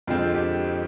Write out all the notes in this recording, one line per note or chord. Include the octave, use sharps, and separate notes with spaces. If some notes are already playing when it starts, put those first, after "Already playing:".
F2 D3 G#3 C4 F4
G4